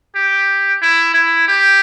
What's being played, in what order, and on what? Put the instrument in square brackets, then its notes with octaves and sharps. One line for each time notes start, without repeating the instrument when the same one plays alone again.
[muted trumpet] G4
E4
E4
G4